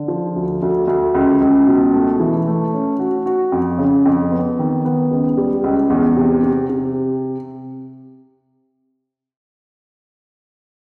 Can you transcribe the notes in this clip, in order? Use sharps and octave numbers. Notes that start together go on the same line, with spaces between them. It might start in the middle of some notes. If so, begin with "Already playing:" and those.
Already playing: D3
F3
D2
D2
D2
C#2
C#2
B2
A3
E3
A3
C#4
F#4
F#4
F2
C#3
F2
B3
D#3
B3
C#2
G3
C#2
E2
C3
C3
C3